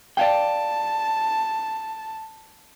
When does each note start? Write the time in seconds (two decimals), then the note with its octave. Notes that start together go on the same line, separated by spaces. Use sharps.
0.17 D5 F5 G5 A5